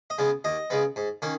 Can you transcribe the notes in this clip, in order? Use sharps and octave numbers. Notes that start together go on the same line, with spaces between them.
D#5
C#3 G#3 B3
D#2 D#5
C#3 G#3 B3
G#2
D#3 A#3 C#4